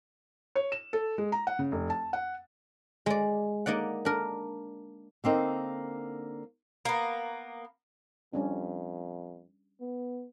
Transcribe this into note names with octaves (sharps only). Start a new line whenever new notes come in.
C#5
E7
A4
G#3
A#5
F#5
C#3
F1
A5
F#5
G#3 D5
A#3 D#4 D5 F#5
D4 A#4
D3 A#3 C4 D#4
A#3 B3
F2 G3 C#4 D4
B3